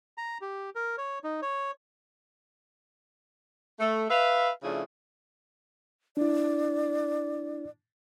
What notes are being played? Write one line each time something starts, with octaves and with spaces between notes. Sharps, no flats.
A#5
G4
A#4
C#5
D#4
C#5
A3
B4 E5 F5
C#3 F3 A3 D4 E4 G#4
D4 E4 D5